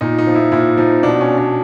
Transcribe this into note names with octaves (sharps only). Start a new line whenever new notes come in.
A#2 D#4
D#4
F3
E4
A#2 E4
F3 D#4
B2 D4
C#4
D4